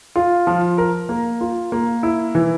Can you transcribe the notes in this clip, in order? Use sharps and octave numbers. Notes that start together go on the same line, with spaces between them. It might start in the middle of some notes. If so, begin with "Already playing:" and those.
F4
F3
A#4
A#3
F4
A#3
E4
E3